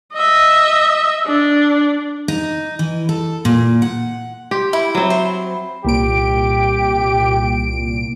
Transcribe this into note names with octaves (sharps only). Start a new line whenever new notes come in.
D#5 E5
D4
D#4
E3
A4
A#2
F#5
G4 C6
E4 B5
F#3 C4 C#5
C5 E5
B5
C2 A#2 G4 D7